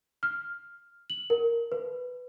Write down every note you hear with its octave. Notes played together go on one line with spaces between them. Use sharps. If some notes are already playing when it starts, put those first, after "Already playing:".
F6
F#7
A#4
B4